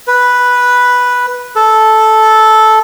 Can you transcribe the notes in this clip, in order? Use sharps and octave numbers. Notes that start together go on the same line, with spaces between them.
B4
A4